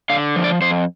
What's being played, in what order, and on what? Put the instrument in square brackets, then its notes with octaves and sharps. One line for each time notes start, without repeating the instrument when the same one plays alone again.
[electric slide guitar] D3 F5
F3
D5
F2 C5